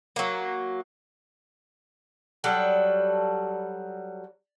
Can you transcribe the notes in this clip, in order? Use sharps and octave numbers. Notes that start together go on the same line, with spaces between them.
F#3 A#3
F#3 G3 A4